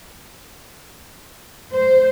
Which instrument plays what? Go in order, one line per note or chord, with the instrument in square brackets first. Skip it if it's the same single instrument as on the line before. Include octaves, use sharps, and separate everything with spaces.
[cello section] C5